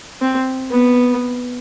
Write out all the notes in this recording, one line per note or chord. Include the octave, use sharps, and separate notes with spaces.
C4
B3